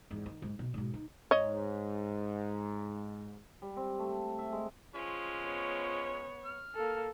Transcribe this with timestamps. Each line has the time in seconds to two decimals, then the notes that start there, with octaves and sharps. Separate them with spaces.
0.11 E2 G#2
0.26 D#3
0.42 G#2
0.59 B2
0.74 G#2 B2
0.94 D#4
1.31 G#2 C#5 D#5
3.62 G3
3.77 C4
3.99 A3
4.39 E5
4.52 G#3
4.95 F3 G#3 C#4
5.42 B3 C#5
6.45 F6
6.75 A#3 A4